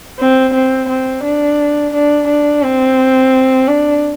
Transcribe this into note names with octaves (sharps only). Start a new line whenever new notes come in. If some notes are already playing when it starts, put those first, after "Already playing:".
C4
C4
C4
D4
D4
D4
C4
D4